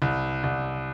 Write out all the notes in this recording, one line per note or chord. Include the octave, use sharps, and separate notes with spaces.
C2
C2